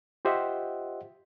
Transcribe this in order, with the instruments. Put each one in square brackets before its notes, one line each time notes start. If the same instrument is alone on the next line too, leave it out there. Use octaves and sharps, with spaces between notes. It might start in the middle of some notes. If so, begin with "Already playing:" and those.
[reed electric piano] F4 G4 C5 D#5 E5 F#5